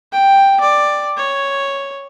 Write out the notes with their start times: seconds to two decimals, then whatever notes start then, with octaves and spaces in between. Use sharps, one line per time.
0.13 G5
0.61 D5
1.17 C#5